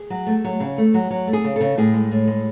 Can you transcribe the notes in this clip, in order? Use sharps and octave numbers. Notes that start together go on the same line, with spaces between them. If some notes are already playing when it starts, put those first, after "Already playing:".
Already playing: G#4
F#3
A3
F#3
C#3
A3
F#3
F#3
A3
G#4
C#3
C#3 A4
A2 G#4
G#3
A2
G#3